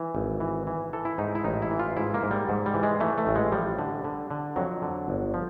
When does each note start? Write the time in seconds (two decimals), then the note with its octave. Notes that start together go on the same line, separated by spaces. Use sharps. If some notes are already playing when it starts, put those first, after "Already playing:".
Already playing: E3
0.15 G#1
0.40 E3
0.67 E3
0.93 E3 A4
1.05 E4
1.18 G#2 D#4
1.35 E4
1.44 A1 D#4
1.62 E4
1.71 E3
1.79 F4
1.97 G#2 E4
2.14 A#3
2.23 G#2
2.31 G3
2.49 G#2
2.66 G3
2.74 E3
2.83 G#3
3.00 E3 A3
3.18 A3
3.27 A1
3.35 G#3
3.52 F3 G3
3.79 D3
4.04 D3
4.31 D3
4.56 F2 F#3
4.82 D3
5.08 G1
5.34 F3